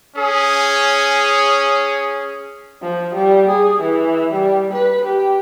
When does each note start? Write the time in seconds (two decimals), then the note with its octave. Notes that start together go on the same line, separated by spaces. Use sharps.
0.16 C#4 G#4
2.82 F3
3.15 G3
3.49 G#4
3.81 E3
4.33 G3
4.73 B4
5.05 G4